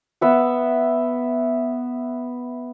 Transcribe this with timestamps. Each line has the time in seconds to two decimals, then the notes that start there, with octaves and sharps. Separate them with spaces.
0.21 B3 E5 F#5